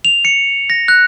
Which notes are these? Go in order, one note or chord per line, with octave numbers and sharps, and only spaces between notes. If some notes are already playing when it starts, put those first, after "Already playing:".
F7
C#7
A#6
F#6